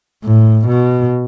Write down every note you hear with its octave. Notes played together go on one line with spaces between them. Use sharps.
A2
B2